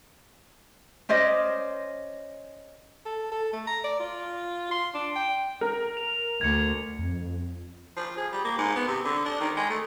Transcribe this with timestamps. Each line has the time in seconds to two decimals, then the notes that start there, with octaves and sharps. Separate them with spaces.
1.09 C#4 C5 D5 D#5
3.05 A4
3.32 A4
3.53 A3
3.67 A#5
3.84 D5
3.99 F4
4.71 C6
4.94 D4
5.16 G5
5.61 A#4
5.97 F7
6.41 D2 G#6 C#7
6.99 F2
7.97 F3
8.17 G#4
8.32 G3
8.45 A#3
8.58 G#2
8.76 B3
8.87 C3
9.05 D3
9.25 D4
9.40 D#3
9.57 G#3
9.70 A3